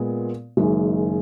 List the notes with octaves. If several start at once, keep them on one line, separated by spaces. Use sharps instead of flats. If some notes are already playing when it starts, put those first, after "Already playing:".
Already playing: A#2 G#3 B3
F#1 F#2 D#3 G#3